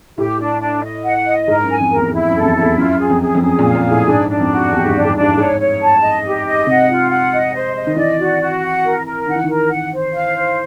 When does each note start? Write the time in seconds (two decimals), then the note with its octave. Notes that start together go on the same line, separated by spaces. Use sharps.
0.17 A2 G4
0.40 D4
0.61 D4
0.83 D#5
1.04 F#5
1.26 D#5
1.48 G#2 A#4
1.64 F#2
1.70 G#5
1.80 F2
1.90 A#4
1.96 E2
2.13 F2 E4
2.29 F#2 A4
2.40 E2
2.45 F2
2.56 E4
2.62 E2
2.77 F#2 F4
2.99 G#4
3.10 F2
3.21 G#4
3.35 F2
3.42 F#2 G#4
3.59 A#2
3.64 F5
3.75 A#2
3.86 A2 G#4
4.07 G#2 D4
4.29 D4
4.40 F2
4.51 F#4
4.72 E2 G4
4.84 G#2
4.88 G2
4.94 D4
5.05 G#2
5.16 G2 D4
5.29 A2
5.37 G#2 C#5
5.59 C#5
5.81 A5
6.02 D#5
6.24 G4
6.45 D#5
6.67 C3 F#5
6.88 F4
7.10 F#5
7.32 D#5
7.54 C5
7.75 D#5
7.87 D#3
7.96 E3 D5
8.18 F#4
8.40 F#4
8.62 F#5
8.84 A#4
9.06 A#4
9.27 D#3 F#5
9.36 E3
9.44 D#3 A#4
9.70 F#5
9.92 C5
10.14 F5
10.35 C5